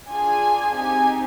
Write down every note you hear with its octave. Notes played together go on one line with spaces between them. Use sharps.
D4 F4 G#4 G#5
C4 D#4 G4 G#5